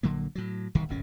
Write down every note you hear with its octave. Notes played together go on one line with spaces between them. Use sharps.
A#1 D3 F#3 A#3
A2 F#3
D1 C2 C3 D#3
D1 G1 A#2 C#4